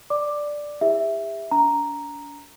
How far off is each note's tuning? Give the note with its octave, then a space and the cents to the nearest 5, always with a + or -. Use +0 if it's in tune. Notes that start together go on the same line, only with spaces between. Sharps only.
D5 +0 D6 +10
E4 +0 G4 +45 E5 +0
D4 -45 A#5 +0